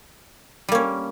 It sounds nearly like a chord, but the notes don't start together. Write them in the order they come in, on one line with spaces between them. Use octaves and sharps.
G3 A#3 C#4